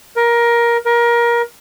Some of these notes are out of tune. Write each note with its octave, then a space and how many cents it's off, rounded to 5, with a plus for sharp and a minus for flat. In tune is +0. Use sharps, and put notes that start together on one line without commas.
A#4 +15
A#4 +25